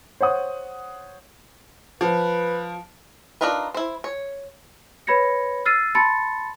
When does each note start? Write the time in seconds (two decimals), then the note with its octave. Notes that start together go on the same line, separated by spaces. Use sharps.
0.21 C5 C#5 F#5 D#6
2.01 F3 B4
3.41 D4 D#4 F4 A#4 B4
3.74 E4 C5
4.04 C#5
5.07 B4 C#5 B5 G#6 A#6 C#7
5.65 E6 F6 A6 C7 D#7
5.95 A5 B5 C6 A6 C#7